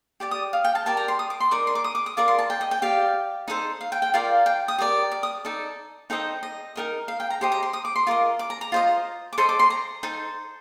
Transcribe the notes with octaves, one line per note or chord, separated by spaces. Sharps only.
G4 D5 D6
D#6
F5
G5
A5
G4 A#4 D5 A5
A#5
C6
D#6
D6
C6
D#4 A#4 D5 D6
C6
D6
D#6
D6
D#6
F4 A#4 D5 D6
C6
A5
G5
D#5
G5
G4 D5 F5
D#4 A4 C5
F5
G5
G5
F4 A#4 D5 F5
G5
D#6
G4 A#4 D5
D6
D#6
D#4 A4 D5
D#4 A4 C5 D#5 G5
D#5
D#4 G4 A#4 D#5
F5
G5
A#5
G4 C5 D#5 C6
A#5
C6
D#6
D6
C6
F4 A#4 D#5 D6
D6
A#5
A#5
F4 C5 D#5
D6
A4 C5 D#5 C6
D6
C6
A#5
D#4 A4 C5 C6